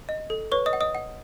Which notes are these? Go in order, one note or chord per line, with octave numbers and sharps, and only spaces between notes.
D#5
A4
B4 C#5 C#6
D#5 D#6
F#5
D#5 D#6
F#5